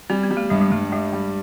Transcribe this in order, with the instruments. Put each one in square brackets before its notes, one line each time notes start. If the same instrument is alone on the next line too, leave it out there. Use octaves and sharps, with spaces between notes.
[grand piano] G3 [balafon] C4
[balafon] B3
[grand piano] G3
[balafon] A3
[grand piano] G2 [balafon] G#3
[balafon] G#3
[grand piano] G2 [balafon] A3
[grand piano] G3 [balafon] G#3
[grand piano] G3